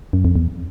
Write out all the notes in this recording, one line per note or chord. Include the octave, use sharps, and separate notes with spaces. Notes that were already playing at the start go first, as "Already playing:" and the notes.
F#2
F2
E2